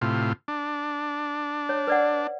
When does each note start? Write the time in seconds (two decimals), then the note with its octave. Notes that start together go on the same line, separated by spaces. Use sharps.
0.02 A2 C3 F4
0.48 D4
1.69 C#5
1.87 B4 D5 F#5